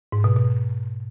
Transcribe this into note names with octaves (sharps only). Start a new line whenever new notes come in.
G#2
B2
B2